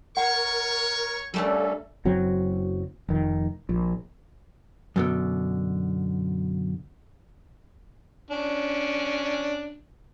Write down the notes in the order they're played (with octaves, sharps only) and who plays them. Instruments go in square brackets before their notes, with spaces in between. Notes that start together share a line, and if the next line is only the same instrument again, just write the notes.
[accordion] A#4 [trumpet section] C#5 C#6 [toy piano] F#5
[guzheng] G3 A3 D4 [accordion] A#3 C#4 A4
[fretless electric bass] F#1 F#3 C4
F1 D#3
A#1
[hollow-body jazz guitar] F#2 B2 D3
[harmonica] C#4 D4